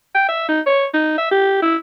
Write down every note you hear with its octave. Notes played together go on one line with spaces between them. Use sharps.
G5
E5
D#4
C#5
D#4
E5
G4
E4